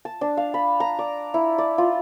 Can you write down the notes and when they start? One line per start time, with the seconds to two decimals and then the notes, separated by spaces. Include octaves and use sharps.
0.05 A5
0.21 D4
0.37 F5
0.54 B5
0.80 A#5
0.99 D5
1.34 E4
1.58 D5
1.78 F4